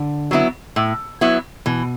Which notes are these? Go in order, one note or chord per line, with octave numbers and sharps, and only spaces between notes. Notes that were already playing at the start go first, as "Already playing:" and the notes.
Already playing: D3
F#3 B3 E4
A2
F#3 B3 E4
B2 E3